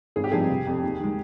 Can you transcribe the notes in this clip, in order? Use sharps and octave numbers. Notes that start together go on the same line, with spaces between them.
G#1 G#4
G4
G2 F3 C4 D#4 G#4
F1
F2 C3
D#2
D#3 G#3